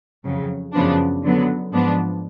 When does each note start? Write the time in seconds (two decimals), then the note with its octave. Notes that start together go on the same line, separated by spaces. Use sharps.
0.25 F2 C#3 F#3
0.73 F#2 C#3 F3 B3 D4
1.22 D3 F#3 B3
1.72 G#2 F3 B3 D4